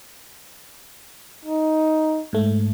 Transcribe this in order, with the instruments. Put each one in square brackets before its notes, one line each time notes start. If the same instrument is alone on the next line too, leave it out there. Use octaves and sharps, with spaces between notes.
[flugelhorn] D#4
[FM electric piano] G#2 A3